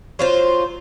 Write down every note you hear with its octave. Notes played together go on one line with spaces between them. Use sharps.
F#3 F4 C5